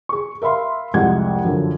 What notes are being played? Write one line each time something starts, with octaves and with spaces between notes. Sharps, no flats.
G#4 C#6
A#4 E5 F5 B5 C6
C2 F2 G#3 F#5 G#6
F#2 D3 F3